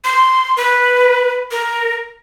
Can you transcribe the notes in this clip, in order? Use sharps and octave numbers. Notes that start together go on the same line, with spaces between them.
C6
B4
A#4